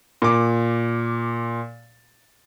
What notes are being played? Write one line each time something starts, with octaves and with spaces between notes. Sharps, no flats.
A#2 D6